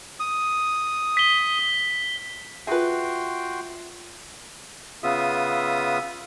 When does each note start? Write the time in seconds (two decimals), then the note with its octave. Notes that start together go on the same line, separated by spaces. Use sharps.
0.20 D#6
1.17 B6 G7
2.67 F4 F#4 G#4 B4 E5 G5 C6
5.03 C#3 B3 F4 E5 D#6